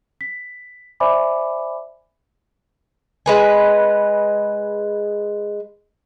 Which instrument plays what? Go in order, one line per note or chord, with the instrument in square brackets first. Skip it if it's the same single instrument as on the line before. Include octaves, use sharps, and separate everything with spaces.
[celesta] B6
C5 D5 E5 G#5 B5 D6
[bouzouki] G#3 B4 G#5